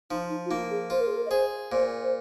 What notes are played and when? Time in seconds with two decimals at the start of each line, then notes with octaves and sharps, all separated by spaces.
0.10 F3 D#4
0.30 D#4
0.45 F4
0.50 A#3 D#4
0.70 G#4
0.90 F4 C5
1.00 A#4
1.07 G#4
1.16 A#4
1.26 D#5
1.30 G#4 C5
1.71 A#2 C5
2.02 C5